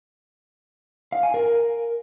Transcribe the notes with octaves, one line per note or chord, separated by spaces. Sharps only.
F5
G#5
A#4